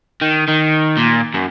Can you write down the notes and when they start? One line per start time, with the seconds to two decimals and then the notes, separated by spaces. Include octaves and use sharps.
0.21 D#3
0.48 D#3
0.97 A#2
1.34 F#2